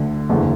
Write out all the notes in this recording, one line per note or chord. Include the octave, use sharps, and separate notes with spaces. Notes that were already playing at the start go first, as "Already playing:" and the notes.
Already playing: D2 D3
F#1 E2 D3